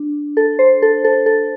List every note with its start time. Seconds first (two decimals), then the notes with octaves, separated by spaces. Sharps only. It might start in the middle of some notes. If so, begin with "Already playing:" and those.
Already playing: D4
0.37 A4
0.59 C5
0.82 A4
1.04 A4
1.26 A4